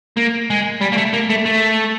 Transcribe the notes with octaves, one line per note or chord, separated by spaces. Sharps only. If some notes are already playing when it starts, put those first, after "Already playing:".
A#3
G#3
G3
A#3
A3
A#3
A3
A3